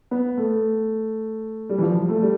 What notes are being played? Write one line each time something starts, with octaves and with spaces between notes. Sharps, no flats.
B3
A3
G3
E3
F3
F3
A3
G3